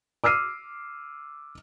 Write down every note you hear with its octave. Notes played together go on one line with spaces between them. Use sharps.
D6 E6 F6 C7 D#7